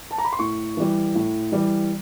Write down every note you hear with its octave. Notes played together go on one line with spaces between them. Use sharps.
A5
A#5
B5
C6
A2 C#6
E3 G3
A2
E3 G3